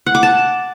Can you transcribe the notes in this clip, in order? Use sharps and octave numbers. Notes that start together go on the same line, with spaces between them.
F#5
D6
A5